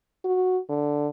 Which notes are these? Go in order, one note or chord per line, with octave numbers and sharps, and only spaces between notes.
F#4
D3